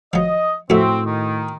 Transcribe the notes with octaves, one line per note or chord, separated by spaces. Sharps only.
F3 F#3 D#5
F2 A2 A3 C4 F#4 E5
D#3